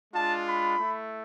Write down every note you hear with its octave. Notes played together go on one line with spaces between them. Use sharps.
G#3 D4 F4 A5
B5
A3 E4